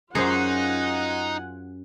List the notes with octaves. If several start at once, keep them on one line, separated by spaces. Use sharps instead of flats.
F#2 D#4 F4 G#4 C5 F#5 G#5